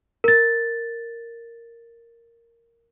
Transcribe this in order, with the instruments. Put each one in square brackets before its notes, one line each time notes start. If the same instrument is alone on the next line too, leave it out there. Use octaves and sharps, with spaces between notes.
[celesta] A#4 A6